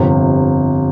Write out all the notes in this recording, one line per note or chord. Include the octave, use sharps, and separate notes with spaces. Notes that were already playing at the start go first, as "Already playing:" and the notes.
Already playing: G1 F2 C3